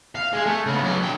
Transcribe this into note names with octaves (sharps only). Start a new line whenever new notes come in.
F5
G#3 G#4
A3
C#3 B3
F#3 D5
D3 G5